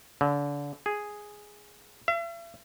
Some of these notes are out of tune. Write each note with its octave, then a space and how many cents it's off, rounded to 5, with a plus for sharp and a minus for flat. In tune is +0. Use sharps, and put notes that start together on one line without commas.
D3 -30
G#4 +0
E5 +45